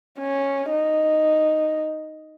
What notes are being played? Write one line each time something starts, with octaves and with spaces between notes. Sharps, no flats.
C#4
D#4